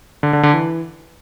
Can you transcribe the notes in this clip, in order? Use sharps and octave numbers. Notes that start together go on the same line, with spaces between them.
D3
D3
D3
E3